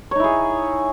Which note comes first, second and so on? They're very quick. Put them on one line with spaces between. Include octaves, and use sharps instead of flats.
C#5 D#4 E4 G#4